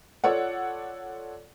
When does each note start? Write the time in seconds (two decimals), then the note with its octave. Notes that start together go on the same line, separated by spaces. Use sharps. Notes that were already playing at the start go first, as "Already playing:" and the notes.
0.24 F4 A4 C#5 D5 F#5